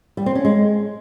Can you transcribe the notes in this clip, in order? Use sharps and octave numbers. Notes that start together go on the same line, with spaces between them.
G3
C4
C#4
G#3